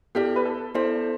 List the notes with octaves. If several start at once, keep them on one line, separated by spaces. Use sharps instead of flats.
B3 E4 G4 A4 D5
B4
A4
B3 E4 A4 C5 D5